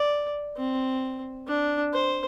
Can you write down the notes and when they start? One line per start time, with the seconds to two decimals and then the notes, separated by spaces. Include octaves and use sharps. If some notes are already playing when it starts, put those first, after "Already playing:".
Already playing: D5
0.57 C4
1.48 D4
1.93 C5